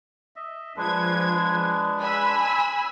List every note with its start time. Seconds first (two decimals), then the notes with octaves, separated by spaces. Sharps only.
0.36 D#5 E5
0.76 F3 G#3 D4 B4 G#6
2.00 G#5 B5 E6